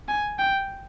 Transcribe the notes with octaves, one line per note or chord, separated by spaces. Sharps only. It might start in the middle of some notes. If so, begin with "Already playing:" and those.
G#5
G5